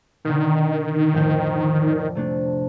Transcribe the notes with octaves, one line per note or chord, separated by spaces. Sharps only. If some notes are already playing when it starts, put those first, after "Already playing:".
B2 D3 D#3
F2 A2 G5
D5
C3 A3 D4